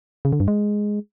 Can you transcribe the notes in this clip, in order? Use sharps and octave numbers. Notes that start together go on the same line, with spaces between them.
C#3
D3
G2
G#3